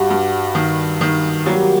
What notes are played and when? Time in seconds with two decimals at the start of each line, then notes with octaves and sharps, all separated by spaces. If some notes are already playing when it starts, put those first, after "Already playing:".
Already playing: G2 G3 D4 F#4
0.10 G2
0.55 D#3
1.01 D#3
1.46 F#3 G3 A#3 F#4